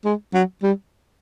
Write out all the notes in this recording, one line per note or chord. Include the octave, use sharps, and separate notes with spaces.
G#3
F#3
G3